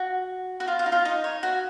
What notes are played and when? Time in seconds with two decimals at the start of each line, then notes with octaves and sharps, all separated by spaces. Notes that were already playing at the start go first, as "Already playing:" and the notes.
Already playing: F#4
0.60 F#4
0.68 F4
0.79 F4
0.86 D#4
0.92 F4
1.05 D#4
1.24 C#5
1.43 F#4